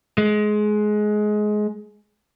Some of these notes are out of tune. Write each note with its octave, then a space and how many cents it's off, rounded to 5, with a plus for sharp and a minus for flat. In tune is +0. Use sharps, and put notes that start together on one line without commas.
G#3 +20